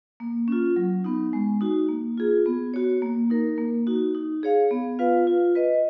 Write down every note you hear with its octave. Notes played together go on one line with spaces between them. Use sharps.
A#3
C#4 F4
F#3
B3 D#4
G#3
D#4 F#4
A#3
F4 G#4
B3
F#4 C#5
A#3
D#4 A#4
A#3
D#4 F#4
D#4
G#4 C#5 F5
B3
F4 B4 F5
F4
B4 D#5